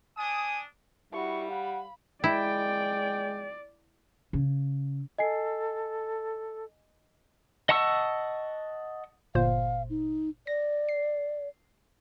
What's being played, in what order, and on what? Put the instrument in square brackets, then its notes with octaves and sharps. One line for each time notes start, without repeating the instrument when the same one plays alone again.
[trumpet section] D4 D#6 [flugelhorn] G#5
[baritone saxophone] G3 [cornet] E4 [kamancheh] F#4 C#6
[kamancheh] F5 B5 [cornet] F#5
[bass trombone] G#3 [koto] E4 [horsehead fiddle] D5 [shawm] G5
[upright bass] C#3
[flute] A4 [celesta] D#5 G#5 C7
[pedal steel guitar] D#5 F#5 A5 C#6 E6
[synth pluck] G1 A#2 C5 [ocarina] F5
[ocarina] D#4
[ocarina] D5 [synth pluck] A#6
[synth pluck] C7